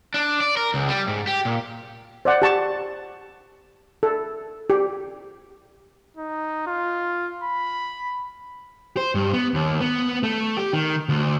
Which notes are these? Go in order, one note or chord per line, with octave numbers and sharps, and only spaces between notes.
D4
D5
A#4
C#2
G3
G#2
G4
A#2
C5 D5 F#5
G4 A5 C#6
A4
G4
D#4
F4
B5
C5
G2
B3
D#2
B3
A3
G4
D#3
D2